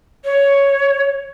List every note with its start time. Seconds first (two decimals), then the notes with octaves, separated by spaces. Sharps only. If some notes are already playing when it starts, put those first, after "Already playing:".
0.24 C#5